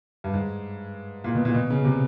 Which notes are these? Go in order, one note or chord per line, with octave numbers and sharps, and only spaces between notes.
G2
G#2
A#2
B2
A#2
B2
C#3
C3